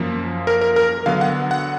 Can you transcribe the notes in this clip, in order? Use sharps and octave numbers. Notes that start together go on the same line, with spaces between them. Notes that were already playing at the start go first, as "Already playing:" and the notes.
Already playing: F#2 F3 A#3
A#4
A#4
A#4
D3 F#3 B3 F5
F#5
F#5